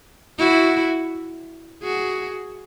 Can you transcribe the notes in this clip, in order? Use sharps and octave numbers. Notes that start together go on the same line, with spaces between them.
E4 F#4
F#4 G#4